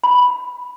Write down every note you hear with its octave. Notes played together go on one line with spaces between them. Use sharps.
B5